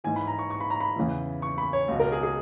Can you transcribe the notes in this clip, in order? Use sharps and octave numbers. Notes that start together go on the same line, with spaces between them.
G#2 E3 G#5
B5
A#5
C#6
C#6
B5
A#5
B5
E2 C#3 E3
C#6
B5
C#5
C#2 B2
A#4
G#4
G#4